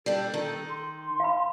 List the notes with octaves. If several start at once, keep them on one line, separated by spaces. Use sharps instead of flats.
G3 D4 A4
D#3
C6
F5 B5